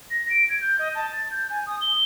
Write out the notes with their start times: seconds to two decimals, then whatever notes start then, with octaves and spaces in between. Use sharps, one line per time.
0.10 A#6
0.30 D7
0.49 G#6
0.61 G6
0.79 D#5
0.95 A5
1.12 A6
1.31 G6
1.50 G#5
1.66 D#6
1.81 G7